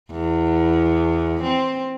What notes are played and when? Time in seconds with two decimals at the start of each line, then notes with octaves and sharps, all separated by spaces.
0.11 E2
1.43 C4